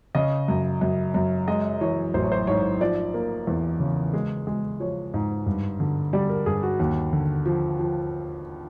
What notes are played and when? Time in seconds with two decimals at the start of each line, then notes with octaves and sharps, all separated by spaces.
0.15 C#3 D#5
0.48 F#2
0.81 F#2
1.15 F#2
1.48 G#3 D#5
1.81 E3 C#5
2.14 A1 C5
2.23 C#5
2.32 C5
2.47 G#2 C#5
2.81 F3 D5
3.14 A#3
3.47 E2
3.80 C#3
4.13 G#3
4.47 G#3
4.80 F3 C#5
5.14 G#2
5.46 G2
5.80 D3
6.13 G3 D5
6.30 A#4
6.46 G2 G#4
6.63 F#4
6.79 D#2
7.13 D3
7.46 F3
7.79 F3